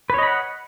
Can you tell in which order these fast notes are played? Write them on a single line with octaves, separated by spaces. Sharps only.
B4 C#5 D#5 B5 F#5